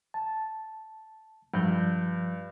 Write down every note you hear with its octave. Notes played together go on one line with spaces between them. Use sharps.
A5
G2 F3 G6